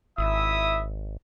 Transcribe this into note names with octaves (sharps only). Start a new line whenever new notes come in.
G#1 E4 E5 D#6